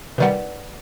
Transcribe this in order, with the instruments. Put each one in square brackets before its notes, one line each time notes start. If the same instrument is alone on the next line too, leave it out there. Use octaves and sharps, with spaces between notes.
[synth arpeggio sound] C3 D#3 G3 [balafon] B4 D5 F#5